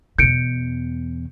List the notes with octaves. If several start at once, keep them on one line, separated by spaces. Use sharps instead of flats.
E2 B2 G6 C#7 D7